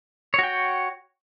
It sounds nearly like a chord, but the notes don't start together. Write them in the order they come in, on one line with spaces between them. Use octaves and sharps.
C#5 F#4 G5